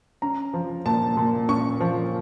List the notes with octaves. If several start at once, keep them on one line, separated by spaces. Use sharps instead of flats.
C#4 A#5
F3
A#2 A5
A#2
C#4 C#6
F3